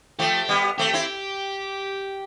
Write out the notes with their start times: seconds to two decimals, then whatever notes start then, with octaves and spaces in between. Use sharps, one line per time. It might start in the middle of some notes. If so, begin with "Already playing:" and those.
0.19 F3 A3 G4
0.49 G3 B3
0.78 A3 C4 G4
0.93 C4 E4